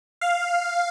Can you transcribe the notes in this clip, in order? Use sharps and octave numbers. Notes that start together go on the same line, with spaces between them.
F5